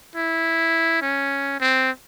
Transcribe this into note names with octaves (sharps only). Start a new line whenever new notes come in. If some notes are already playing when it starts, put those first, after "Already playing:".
E4
C#4
C4